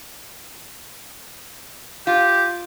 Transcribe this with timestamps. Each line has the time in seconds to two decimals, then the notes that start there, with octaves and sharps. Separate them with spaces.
2.07 F4 G4